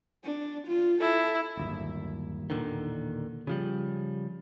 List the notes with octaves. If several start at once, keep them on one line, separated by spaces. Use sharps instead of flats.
D4
F4
E4 A4
D1 G1 D#2
E1 A#2 D3 D#3
C#3 F3 G3